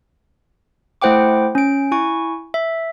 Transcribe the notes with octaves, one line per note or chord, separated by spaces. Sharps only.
A3 E4 C5 F#5 G5 D6
C#4 D7
E4 G#5 C#6
E5